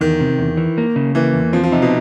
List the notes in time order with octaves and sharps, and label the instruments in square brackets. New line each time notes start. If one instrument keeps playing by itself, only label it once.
[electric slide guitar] E2 [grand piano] D#3
[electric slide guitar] C3
E2
E3
A#3
C#3
[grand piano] E3 [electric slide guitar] A#3
[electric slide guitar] E2
[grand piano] F3 [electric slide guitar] C4
[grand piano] F3
[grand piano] C3 [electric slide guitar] D#4
[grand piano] B2